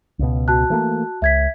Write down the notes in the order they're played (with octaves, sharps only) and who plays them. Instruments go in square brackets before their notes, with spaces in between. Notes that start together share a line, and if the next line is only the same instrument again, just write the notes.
[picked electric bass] C#2 B2
[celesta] F#4 A5 F#6
[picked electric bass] E3 A3 A#3
[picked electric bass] C#2 [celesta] E5 G#6 B6